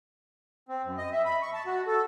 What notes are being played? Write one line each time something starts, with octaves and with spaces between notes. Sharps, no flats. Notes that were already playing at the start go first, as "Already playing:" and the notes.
C4
F#2
D#5
E5
B5
C#6
A5
F#4
A4